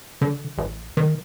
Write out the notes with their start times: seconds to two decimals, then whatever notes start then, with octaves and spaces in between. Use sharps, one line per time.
0.21 D3
0.58 A1
0.97 D#3